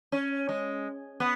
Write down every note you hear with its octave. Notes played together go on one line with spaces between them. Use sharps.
C#4
G#3
B3